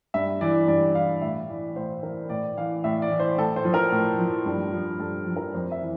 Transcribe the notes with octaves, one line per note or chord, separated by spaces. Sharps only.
G2 E5
E3 D5
G2 D5
E3 F5
A2 E5
E3 D5
A2 C5
E3 A#4
A2 D5
E3 F5
A2 E5
D5
E3
C5
A2 A4
C5
F3
A#4
A2
F3
G2
F3
G2 A4
F3
A#4
F2 C5
E5
E3